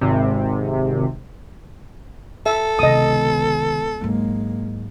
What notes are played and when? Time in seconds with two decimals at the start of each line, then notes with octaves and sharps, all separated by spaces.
0.01 G#1 C3
2.46 A4 E5
2.79 C#2 C3 D#3 B3 D#5 D#6
4.01 G#2 F#3 G#3 A#3